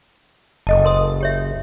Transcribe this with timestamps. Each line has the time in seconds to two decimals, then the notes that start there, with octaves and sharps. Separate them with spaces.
0.67 F#1 A4 D#5 A5
0.85 A#4 C6 D#6
1.21 G4 C#5 E5